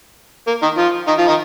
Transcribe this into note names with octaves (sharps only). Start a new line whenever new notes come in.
A#3
D#3 D#4
F3 F4
D#3 D#4
F3 F4
D#3 D#4